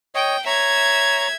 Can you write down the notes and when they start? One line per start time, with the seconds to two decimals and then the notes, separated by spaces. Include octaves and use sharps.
0.15 C#5 D#5 G5
0.46 C#5 E5 A#5 G#6